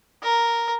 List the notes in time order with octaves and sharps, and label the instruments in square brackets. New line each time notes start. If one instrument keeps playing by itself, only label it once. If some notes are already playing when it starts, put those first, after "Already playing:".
[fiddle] A#4